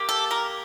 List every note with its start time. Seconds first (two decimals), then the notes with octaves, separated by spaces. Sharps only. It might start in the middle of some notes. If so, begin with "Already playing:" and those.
Already playing: A#3 G4
0.09 A4
0.31 A#4